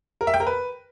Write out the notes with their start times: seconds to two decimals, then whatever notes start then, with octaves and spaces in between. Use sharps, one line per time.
0.21 A#4
0.27 E5
0.34 G5
0.40 A#4
0.47 B4